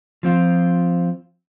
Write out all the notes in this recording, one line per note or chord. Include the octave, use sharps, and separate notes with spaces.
F3 C4 F4